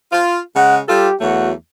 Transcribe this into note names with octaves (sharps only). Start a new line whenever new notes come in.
F4
C#3 G#3 F#5
G3 F4 G4 A4
E2 F#3 A3 F#4